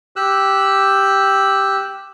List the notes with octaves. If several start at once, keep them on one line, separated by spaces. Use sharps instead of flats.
G4 E6 F#6